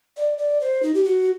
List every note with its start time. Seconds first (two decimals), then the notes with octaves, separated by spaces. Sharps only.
0.17 D5
0.38 D5
0.61 C5
0.83 D#4
0.94 G4
1.05 F#4